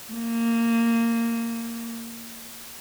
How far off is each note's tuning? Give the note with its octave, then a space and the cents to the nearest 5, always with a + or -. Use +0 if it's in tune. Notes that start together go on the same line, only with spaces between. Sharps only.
A#3 -15